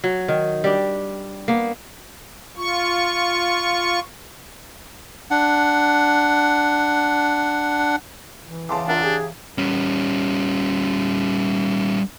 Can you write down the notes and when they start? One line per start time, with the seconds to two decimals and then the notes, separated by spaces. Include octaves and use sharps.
0.04 F#3
0.28 D#3
0.64 G3 D4
1.48 A#3 B3
2.57 F4 C#6
5.31 D4 F#5
8.43 E3
8.69 E2 C#3 A5 C6 D6
8.88 D4 F4 A#4 E5 F#5
9.03 G4 G#4
9.58 G3 C#4